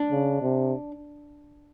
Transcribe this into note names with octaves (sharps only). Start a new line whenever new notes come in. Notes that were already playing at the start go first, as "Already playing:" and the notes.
Already playing: D4
C#3
C3